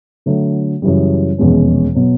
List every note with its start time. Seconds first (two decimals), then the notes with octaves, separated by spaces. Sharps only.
0.26 D3 F#3 A3
0.82 F#2 C#3 E3 G3
1.38 F1 E2 B2 G#3 C#4
1.95 B2 F#3